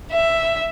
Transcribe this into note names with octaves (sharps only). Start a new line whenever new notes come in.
E5